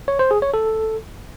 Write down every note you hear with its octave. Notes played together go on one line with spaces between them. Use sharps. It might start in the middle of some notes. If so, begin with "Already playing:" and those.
C#5
C5
G#4
C#5
A4